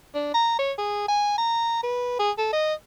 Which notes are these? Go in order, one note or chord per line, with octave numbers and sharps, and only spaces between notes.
D4
A#5
C#5
G#4
G#5
A#5
B4
G#4
A4
D#5